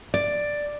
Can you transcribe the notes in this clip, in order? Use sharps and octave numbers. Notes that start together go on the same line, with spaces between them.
D5